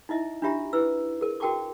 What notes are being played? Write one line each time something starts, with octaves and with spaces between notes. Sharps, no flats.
D#4 E4 D#5 E5
D4 E4 F4 G4 E5 A#5
E4 B4 E6
G#4 A#4
F#4 A#4 G5 A5 C#6 D6